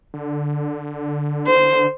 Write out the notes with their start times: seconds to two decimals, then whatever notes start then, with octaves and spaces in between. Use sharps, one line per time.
0.14 D3
1.47 C5